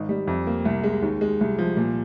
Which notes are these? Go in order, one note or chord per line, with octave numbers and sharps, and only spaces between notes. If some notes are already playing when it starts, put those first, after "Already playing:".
Already playing: G#1 D#4
G3
F2
A#3
C2
G#3
D#2
G#3
C2
F3
A#2